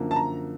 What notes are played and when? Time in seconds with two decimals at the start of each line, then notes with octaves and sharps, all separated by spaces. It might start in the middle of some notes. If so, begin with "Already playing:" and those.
Already playing: F#2 D3 F3 A#3
0.11 A5
0.16 A#5